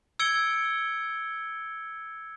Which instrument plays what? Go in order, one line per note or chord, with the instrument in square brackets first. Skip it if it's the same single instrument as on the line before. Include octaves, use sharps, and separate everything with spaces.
[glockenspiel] E6 G#6 C#7 D7 G7